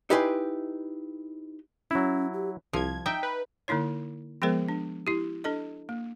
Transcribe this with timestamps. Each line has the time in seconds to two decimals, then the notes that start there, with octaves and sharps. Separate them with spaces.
0.10 D#4 E4 G4 B4 G#5 C6
1.91 F#3 C#4 E4
2.34 G4
2.73 C2 F3 G#6
3.06 D#4 E5 G5
3.23 B4
3.68 D3 A#3 D#4 E4 C#5
4.42 F3 G#3 B3 G#4 A#4 C5
4.69 D4
5.07 E4 G4
5.44 D4 A4 D#5
5.89 A#3